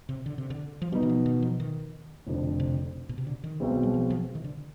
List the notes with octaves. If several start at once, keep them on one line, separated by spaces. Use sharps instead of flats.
C3
D3
C3
D3
F3
B2 G3 B3 D#4
D#3
F3
D#3
F3
D#3
F1 F2 D3
C3
B2
C3
D3
D#3
B1 B2 G#3 C4
G3
F3
F3
D#3
D3